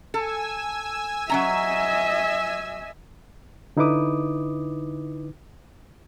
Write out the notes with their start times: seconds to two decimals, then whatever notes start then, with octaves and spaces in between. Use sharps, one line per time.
0.14 A4 G#5 E6
1.29 F#3 C#4 D#5 E5 A#5
3.77 D3 D#4 E4 B4 D6 D#6